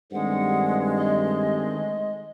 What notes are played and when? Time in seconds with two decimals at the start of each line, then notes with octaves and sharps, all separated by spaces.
0.12 G2 D#3 G#3 A3 C4 F#5
0.98 D#5